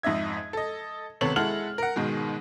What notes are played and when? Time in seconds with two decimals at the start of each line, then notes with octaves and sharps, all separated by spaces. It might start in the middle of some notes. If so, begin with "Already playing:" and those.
0.03 F2 G#2 D#5 E5 G#6
0.53 A4 D#5
1.21 G#1 C3 B3 A4 C#5 F#7
1.36 G#3 E4 A4 F#5 F6 F#7
1.78 A#4 F#5
1.96 G#2 B2 D#3 G#3